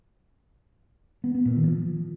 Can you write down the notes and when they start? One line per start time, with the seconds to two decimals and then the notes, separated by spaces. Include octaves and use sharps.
1.24 B3
1.35 B3
1.45 A#2
1.56 D#3
1.67 F3